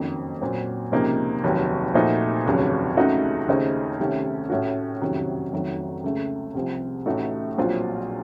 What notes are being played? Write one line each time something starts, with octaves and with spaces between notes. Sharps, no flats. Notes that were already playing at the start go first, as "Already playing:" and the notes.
Already playing: F#1 F2 D#3 F#3 A#3
A#2 F#3 C4
C#2 C3 F3 A#3 D#4
F1 D#2 D#3 F#3
A#2 F3 A3 D#4 F#4
F1 D#2 C#3 F#3
C#2 C#3 A3 D#4 F#4
D#2 C#3 A3 C4 D#4
C2 C3 D#3 A3 C#4
A2 A3 C#4 F#4
F#1 F2 C3 D#3 F#3
F1 F2 D#3 F#3 A3
C#2 C#3 A3
C2 C3 F3
A1 A2 A3 D#4 F#4
A#1 A#2 F#3 C4 F4